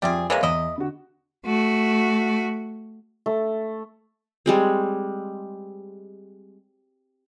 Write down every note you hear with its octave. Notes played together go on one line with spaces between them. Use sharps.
F2 G3 C4 G#4 E5 D6
E3 G#3 A#3 C#5 F5
E2 E4 D#5
D3 F#4
A3 F#4
A3
G3 G#3 C4